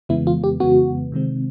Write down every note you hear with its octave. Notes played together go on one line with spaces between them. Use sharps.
F2 C#3 E3 G#3 B3 E4
F4
G4
F2 C#3 E3 G#3 B3 F#4
C3 D#3 G#3 C4